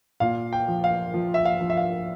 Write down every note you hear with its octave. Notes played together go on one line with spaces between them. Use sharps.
A#2 F5
G5
F3
F5
F3
E5
F5
F3
E5
F5